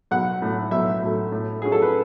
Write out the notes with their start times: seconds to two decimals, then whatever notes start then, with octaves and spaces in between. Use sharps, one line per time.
0.11 B1 F#5
0.42 A2 F#3 A3
0.71 B1 E5
1.02 A2 F#3 A3
1.32 A2
1.62 F#3 C#4 G#4
1.72 A4
1.82 B4